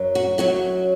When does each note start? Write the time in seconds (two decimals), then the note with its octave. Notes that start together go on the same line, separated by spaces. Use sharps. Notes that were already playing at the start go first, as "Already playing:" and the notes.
Already playing: F#2 F#3
0.15 F#4
0.38 F#2 F#3 F#4